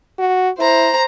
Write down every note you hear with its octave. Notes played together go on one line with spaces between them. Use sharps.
F#4
E4 C5 A#5